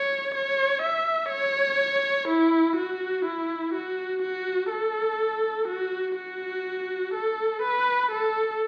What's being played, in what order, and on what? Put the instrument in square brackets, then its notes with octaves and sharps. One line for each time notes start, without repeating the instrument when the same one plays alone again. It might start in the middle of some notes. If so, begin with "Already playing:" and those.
Already playing: [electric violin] C#5
C#5
E5
C#5
E4
F#4
E4
F#4
F#4
A4
F#4
F#4
A4
B4
A4